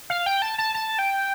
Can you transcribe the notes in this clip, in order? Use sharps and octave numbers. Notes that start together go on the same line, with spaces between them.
F5
G5
A5
A5
A5
G5